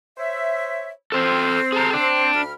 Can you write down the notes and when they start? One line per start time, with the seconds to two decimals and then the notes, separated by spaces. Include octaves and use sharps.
0.17 C5 C#5 E5
1.12 C4 A4 C5
1.73 G#4 A4 A#5
1.94 D4
2.34 D2 B5 F6